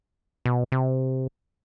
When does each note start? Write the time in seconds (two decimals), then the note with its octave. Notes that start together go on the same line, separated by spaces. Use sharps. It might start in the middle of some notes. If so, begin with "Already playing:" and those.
0.46 B2
0.72 C3